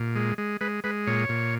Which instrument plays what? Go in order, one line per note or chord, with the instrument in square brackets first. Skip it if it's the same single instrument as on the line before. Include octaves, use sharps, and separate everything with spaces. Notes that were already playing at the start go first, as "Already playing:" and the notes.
Already playing: [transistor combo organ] A#2
G#3
G#3
G#3 B4
G#3 B4
A#2 C#5
A#2